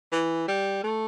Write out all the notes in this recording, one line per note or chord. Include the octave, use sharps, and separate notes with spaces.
E3
G3
A3